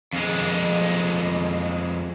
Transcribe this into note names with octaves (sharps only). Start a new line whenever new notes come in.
F2 G#3